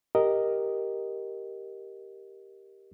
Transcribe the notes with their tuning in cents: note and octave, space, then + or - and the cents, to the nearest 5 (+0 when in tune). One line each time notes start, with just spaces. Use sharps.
G4 +0 A#4 +0 D#5 +0